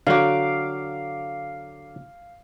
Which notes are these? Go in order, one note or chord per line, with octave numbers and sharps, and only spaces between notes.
D3 F#3 F#4 F5 D6